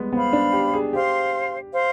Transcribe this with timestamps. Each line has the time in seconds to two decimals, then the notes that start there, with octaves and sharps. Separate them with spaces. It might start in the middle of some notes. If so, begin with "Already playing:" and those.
Already playing: G3 G#3 B3
0.12 B3 C5 F5 B5
0.33 D4
0.53 G4
0.74 G#4
0.93 G4 C5 F5 C6
1.73 C5 F5 C6